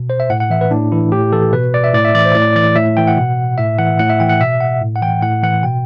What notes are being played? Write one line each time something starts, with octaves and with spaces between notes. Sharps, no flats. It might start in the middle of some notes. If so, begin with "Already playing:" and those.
Already playing: B2
C5
E5
A2 F#5
F#5
E3 E5
B4
A2 D4
E3 E4
A2 G4
E3 A4
B2 B4
D5
E5
A2 D5
E5
E3 D5
C5
A2 D5
E3 D5
A2 E5
E3 G5
F#5
B2
A2 E5
E3 F#5
A2 F#5
E5
E3 G5
F#5
B2 E5
F#5
A2
F#5
E3 G5
A2 F#5
E3 F#5
B2 G5